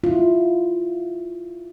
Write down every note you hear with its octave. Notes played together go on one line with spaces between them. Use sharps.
E4 F4